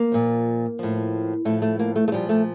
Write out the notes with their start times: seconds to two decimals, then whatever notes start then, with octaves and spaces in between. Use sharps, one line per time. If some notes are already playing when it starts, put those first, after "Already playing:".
Already playing: A#3
0.12 A#2 F3
0.79 A2 F3
1.45 A2 F3 A3
1.62 A3
1.79 A#3
1.96 A3
2.08 A3
2.12 A#2 F3 G3
2.29 A3